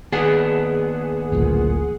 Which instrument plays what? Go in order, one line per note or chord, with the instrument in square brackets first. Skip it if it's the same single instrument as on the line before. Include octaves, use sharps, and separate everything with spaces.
[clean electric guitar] D#2 B3 D4 [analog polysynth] G#4 F#5
[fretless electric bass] D1 A1 A#2